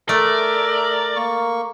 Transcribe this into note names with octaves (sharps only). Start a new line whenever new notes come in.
A3 A#4 D5 E5
A#3 C#6